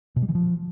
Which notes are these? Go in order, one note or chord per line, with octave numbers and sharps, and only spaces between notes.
B2
G3
E3
F3